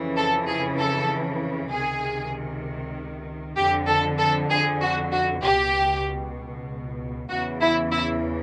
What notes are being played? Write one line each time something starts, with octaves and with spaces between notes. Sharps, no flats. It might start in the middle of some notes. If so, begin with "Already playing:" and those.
Already playing: F2 C#3 E3
A4
G#4
A4
C#2 C3 D#3 G#4
F2 D3 G4
A4
A4
G#4
F#4
F#4
C#2 B2 G4
E2 C#3 E3 F#4
E4
E4